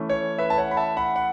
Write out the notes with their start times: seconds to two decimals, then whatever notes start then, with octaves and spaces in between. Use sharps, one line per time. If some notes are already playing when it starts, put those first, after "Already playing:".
Already playing: E3 A3 C#4
0.10 C#5
0.38 B4 E5
0.50 A5
0.58 C#5 F#5
0.71 B5
0.77 E5 A5
0.97 F#5 B5
1.16 F#5